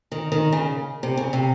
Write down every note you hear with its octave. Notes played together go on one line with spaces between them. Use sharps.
D#3
D#3
C#3
C3
C#3
C3